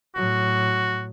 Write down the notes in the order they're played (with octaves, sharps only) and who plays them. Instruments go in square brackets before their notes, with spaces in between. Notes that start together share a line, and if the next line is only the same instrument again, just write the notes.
[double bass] A2 F#3 [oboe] F#4